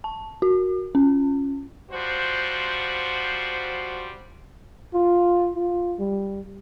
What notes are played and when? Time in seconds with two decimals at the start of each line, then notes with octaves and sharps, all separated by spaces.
0.04 A5
0.42 F#4
0.95 C#4
1.90 F3 G3 F#4 C5
4.95 F4
5.56 F4
5.99 G3